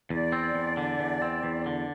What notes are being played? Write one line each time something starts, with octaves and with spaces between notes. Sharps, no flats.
E2 D5
C4
E2
D3
E2
C4
E2
D3